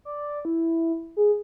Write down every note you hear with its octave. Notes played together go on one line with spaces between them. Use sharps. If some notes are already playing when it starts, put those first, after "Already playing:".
D5
E4
G#4